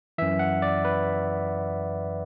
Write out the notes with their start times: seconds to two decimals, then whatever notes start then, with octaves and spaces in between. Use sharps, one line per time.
0.18 F#2 E3 E5
0.39 F#5
0.62 D5
0.85 B4